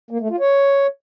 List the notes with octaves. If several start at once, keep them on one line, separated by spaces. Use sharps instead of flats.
A#3
A3
F4
C#5